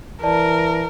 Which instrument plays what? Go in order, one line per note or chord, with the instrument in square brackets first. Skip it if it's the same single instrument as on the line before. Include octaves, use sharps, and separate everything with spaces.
[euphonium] E3 [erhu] A#4 [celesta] D5 A5